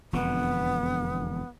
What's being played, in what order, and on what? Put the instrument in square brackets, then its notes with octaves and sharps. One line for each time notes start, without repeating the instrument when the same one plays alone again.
[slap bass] E1 F2 D3 [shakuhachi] B3